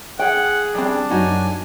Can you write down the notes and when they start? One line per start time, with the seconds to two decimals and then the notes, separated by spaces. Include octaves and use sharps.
0.19 G#4 F#5 G5
0.75 G3 C4 D4
1.10 F#2 D#4 F#4 G#5